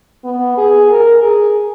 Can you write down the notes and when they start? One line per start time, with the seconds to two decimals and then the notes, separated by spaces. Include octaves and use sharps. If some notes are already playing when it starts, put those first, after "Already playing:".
0.25 B3
0.58 G#4
0.90 A#4
1.23 G#4